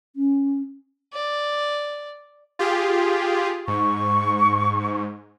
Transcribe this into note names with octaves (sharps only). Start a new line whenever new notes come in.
C#4
D5
F4 G4 G#4
G#2 C#6